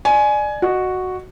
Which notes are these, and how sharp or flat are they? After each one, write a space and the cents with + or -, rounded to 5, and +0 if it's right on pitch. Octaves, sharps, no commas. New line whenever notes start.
D5 +25 G#5 +15
F#4 +0 D#5 -25